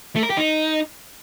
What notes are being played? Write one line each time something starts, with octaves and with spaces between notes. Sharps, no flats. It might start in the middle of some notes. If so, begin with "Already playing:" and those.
A3
A#4
G4
D#4